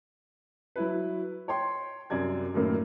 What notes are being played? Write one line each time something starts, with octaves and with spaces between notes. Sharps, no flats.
F#3 E4 B4
C#5 G5 C6
C2 F#2 D5 G#6
F#2 A2 D#3 A#3